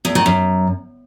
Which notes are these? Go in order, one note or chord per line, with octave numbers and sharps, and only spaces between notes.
E2
D#3
F#2